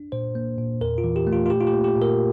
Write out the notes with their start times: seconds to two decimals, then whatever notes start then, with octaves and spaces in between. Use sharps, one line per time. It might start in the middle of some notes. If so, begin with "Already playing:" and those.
Already playing: D4
0.12 A#2 C5
0.35 A#3
0.58 A#2
0.81 E2 A#4
0.98 F4
1.04 E3
1.16 G4
1.27 A3
1.33 F4
1.46 F4
1.50 A#2 G4
1.60 F4
1.67 G4
1.73 A#3
1.84 G4
1.96 A#2
2.02 A#4